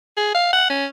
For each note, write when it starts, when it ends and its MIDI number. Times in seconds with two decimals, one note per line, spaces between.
0.17 0.30 68
0.35 0.49 77
0.53 0.66 78
0.70 0.86 61